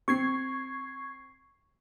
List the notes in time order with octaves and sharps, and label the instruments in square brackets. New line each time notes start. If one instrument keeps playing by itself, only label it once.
[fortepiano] C4 [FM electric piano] C#6 G#6 C7